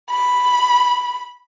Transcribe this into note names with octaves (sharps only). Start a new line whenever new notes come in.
B5